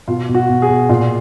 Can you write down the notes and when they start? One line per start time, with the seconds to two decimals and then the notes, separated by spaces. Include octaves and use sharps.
0.08 B2 F4
0.29 B2
0.35 F#4
0.49 B2
0.62 G#4
0.68 B2
0.89 A#2 F4